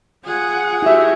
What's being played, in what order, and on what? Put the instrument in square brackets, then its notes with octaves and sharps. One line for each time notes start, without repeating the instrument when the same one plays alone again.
[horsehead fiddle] F4 F#5 [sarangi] G#4
[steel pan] E4 E5 [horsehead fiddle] F#4 G4